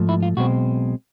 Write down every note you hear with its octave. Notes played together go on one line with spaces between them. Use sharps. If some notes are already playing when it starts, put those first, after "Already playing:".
Already playing: G#2 F3 A3
E4
F4
B1 B2 G#3 C4 F#4